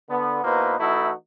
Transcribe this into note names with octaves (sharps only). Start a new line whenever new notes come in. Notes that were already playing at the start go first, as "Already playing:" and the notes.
D3 B3
B2 A#3 D#4 E4 B4 C5
E3 A3 D#4 E4 F#4 A4